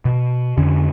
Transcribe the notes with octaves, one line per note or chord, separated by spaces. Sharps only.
B2
F2 D3 C#4